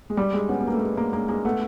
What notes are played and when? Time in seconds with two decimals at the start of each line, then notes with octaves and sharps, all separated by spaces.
0.10 G#3
0.17 G3
0.33 G#3
0.49 B3 C#4
0.60 B3
0.67 A#3
0.73 A3
0.81 G#3
0.97 G#3 A#3
1.13 G#3 A#3
1.29 G#3 A#3
1.45 A3 B3